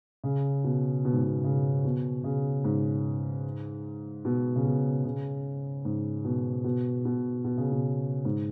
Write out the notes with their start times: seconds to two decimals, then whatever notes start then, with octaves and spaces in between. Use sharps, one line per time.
0.24 C#3
0.64 B2
1.05 B2
1.13 G#2
1.22 B2
1.44 C#3
1.84 B2
2.24 C#3
2.64 G#2
4.25 B2
4.56 C#3
4.65 B2
5.05 C#3
5.85 G#2
6.24 B2
6.64 B2
7.05 B2
7.44 B2
7.58 C#3
7.71 B2
8.25 G#2